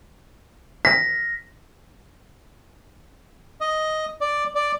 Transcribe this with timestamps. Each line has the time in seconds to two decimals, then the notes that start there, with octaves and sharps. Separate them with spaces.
0.85 A#6 B6
3.61 D#5
4.21 D5
4.55 D5